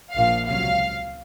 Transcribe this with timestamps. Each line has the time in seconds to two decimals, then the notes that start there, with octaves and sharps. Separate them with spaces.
0.15 A#1 A#2 F3 F5
0.48 C#2 C3 F#3 F5